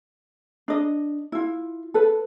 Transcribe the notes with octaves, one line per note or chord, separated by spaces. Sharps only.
D4 D#5
E4 F4
A4 B4